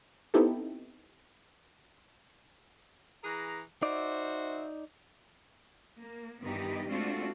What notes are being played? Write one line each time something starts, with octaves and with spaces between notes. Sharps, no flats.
B3 C4 D#4 E4 G4 A4
E3 G#4 A#5
D#4 F#4 C5 D5 E5
A#3
G2 D#3 E3 B3 D#4 G4
G#3 A3 C4 D4 F4 F#4